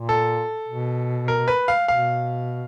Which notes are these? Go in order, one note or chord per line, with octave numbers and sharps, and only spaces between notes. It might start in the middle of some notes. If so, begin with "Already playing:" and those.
Already playing: A#2
A4
B2
A#4
B4
F5
B2 F5